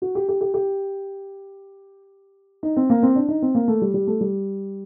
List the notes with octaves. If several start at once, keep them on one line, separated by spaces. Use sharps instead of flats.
F#4
G4
G4
G4
G4
D#4
C4
A#3
C4
D4
D#4
C4
A#3
A3
G3
G3
A3
G3